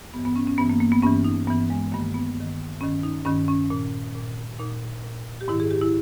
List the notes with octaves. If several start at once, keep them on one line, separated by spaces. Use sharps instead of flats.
G2 E3 B3
B3
C#4
C#4
G2 E3 B3
A#3
A#3
B3
G2 E3 C#4
D#4
G2 E3 B3
G#3
G2 D#3 A#3
B3
G2 D#3
G2 D#3 C#4
D#4
G2 D#3 C#4
C#4
A#2
A#2
A#2 D#4
A#2
G4
G#2 D#3 E4
G#4
G4
E4